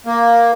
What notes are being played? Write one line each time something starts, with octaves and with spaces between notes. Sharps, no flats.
A#3